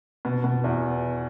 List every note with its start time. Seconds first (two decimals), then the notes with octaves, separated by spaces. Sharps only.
0.25 B2
0.44 B2
0.64 E2